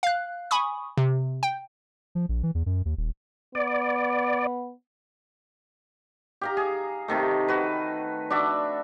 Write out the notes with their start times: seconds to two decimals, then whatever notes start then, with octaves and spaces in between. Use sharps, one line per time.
0.03 F5 F#6
0.51 G#5 B5 C#6 D#6
0.97 C3
1.43 G5
2.15 F3
2.29 A#1
2.43 E3
2.55 E2
2.66 F#2
2.85 D#2
2.97 D#1
3.55 B3 D5
6.41 G4 F5 A#5
6.57 G#4
7.08 C3 D#3 A3
7.48 F#4 B4
8.30 D4 F#4 D5 E5